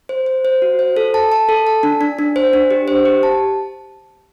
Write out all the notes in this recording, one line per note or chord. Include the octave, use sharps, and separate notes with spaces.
C5
C5
C5
F#4
C5
A4
A5
A5
A4
A5
D4
D4
D4
C5
D4
G4
C5
G4
A5